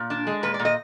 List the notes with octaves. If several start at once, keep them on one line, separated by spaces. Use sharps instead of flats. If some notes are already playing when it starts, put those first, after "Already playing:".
Already playing: A#2
D4
G#3
A#2 B4
D5
A#2
D#5